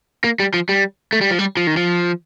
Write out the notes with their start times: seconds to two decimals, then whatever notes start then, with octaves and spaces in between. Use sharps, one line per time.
0.24 A#3
0.40 G3
0.54 F3
0.69 G3
1.13 A3
1.21 G3
1.31 F3
1.39 G3
1.57 F3
1.67 D#3
1.77 F3